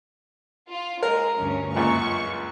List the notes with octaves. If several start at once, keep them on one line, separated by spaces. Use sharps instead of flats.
F4
G#3 A#4
D2 G2 C#4
C#2 F#2 A#2 C#6